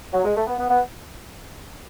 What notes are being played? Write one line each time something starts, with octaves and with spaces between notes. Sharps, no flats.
F#3
G#3
A3
B3
B3
B3